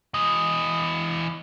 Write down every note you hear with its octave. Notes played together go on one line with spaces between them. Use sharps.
E3 D#5